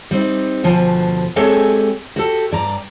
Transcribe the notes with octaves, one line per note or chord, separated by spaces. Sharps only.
G3 C4 D#4
D2 B2 F3
G#3 C4 G4 A4 C#5 G#5
F#4 G4 A4
G2 D5 A#5